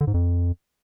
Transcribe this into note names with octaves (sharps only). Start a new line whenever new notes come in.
D3
G#2
F2